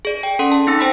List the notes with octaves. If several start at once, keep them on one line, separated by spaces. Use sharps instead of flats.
G#4 D5
G5
C#4 A4 F#5 C6
A5
C4 D#4 E6 A#6
C5 G5 B5 B6